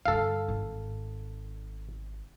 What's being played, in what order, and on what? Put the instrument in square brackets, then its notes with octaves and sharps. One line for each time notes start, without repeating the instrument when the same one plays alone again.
[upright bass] G2 D3 [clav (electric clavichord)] A4 F5
[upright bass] G#1